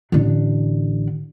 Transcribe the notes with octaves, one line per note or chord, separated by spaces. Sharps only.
A1 D3